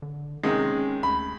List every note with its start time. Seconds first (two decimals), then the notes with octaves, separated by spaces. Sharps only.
0.02 D3
0.43 C3 D#3 G#3 C#4
1.03 D2 B5